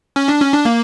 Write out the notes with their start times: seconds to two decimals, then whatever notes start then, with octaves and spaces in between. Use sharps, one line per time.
0.16 C#4
0.28 D4
0.40 C#4
0.53 D4
0.65 A#3